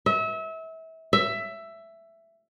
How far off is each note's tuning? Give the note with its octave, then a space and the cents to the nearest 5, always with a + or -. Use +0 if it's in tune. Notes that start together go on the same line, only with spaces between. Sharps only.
E5 -30
E5 +10